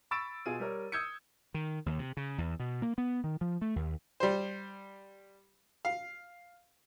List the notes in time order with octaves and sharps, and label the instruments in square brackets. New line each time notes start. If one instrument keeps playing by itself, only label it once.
[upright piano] B5 C#6 E6 A6 D7 E7
B2 F4 G#4 D#7
G3 A#4 C#5
D#6 E6 G6 G#6 C#7
[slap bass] D#3
D#2
C3
C#3
E2
B2
A#3
B3
D#3
F3
A3
D#2
[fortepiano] G3 C5
F5